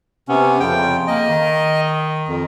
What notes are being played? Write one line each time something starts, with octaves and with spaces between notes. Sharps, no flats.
C3 B3 C#4
F2 C#3 F3 G5
A#3 D#5
D#3
F2